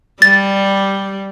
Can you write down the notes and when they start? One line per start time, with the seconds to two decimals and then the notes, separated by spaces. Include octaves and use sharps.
0.22 G3 A6